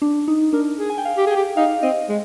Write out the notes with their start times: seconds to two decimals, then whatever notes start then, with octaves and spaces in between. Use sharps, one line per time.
0.02 D4
0.28 D#4
0.53 D4 A#4
0.79 G#4
0.90 G#5
0.98 G5
1.05 F5
1.17 G4
1.27 G#4 G5
1.36 G4
1.57 D#4 F5
1.83 C4 D#5
2.09 G#3